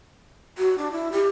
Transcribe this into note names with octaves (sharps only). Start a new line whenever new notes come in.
F#4
D4
E4
G4